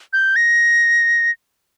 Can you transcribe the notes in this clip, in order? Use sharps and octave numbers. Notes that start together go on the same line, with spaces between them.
G6
A#6